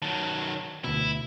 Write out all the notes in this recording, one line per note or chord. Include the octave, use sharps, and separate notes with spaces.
D#3 F#3 A5
D2 B2 E4